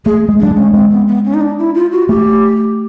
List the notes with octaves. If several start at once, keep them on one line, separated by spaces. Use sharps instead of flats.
A3 G#4
G#3
G3 D4
G#3
C#4
G#3 C4
B3
B3
C#4
D#4
D4
E4
F4
F#4
A3 G4